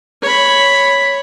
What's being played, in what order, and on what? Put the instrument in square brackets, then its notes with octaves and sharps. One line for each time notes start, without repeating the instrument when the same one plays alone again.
[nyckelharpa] C#5 B5